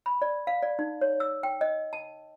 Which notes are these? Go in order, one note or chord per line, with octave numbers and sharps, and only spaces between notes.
B5
D5
F5
D5
D#4
C#5
E6
G5
D#5
A5